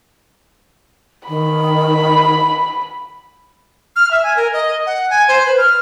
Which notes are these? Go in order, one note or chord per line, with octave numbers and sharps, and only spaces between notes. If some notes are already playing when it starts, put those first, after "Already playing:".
D#3 B5
F6
E5
G#5
A#4
D#5
F#5
G#5
C5
B4
F6